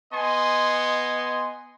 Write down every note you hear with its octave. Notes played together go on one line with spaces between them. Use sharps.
B3 D#5 G#5 C6